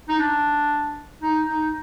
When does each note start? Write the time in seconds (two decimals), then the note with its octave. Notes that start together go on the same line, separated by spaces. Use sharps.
0.09 D#4
0.20 D4
1.22 D#4
1.49 D#4